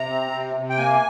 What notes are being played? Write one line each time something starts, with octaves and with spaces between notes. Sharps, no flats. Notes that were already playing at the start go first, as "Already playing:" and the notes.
Already playing: C3 A#5
C4
C3
C3
G5
A#3 G#5